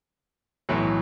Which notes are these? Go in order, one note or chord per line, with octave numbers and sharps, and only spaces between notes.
B1 A2 E3 F#3